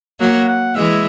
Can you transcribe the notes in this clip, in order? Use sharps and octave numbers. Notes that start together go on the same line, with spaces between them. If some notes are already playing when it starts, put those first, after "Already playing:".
F#3 A#3 F#5
F#5
E3 G#3 E5